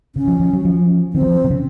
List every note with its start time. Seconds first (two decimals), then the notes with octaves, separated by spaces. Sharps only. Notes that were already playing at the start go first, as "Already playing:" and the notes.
0.15 C#3 C#4
0.27 F3
0.40 F3
0.53 F#3
0.65 F3
1.13 D#3 C4
1.21 F#3
1.26 F3
1.44 C3
1.51 C#3